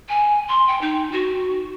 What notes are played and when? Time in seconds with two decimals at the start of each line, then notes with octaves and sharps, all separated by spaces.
0.09 G#5
0.48 C6
0.67 G5
0.81 D#4
1.11 F#4